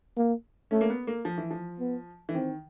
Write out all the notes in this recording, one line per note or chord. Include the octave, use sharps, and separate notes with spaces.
A#3
A3 C#4
A#3
B3
A#3
F3
E3
F3
B3
E3
D#3 C4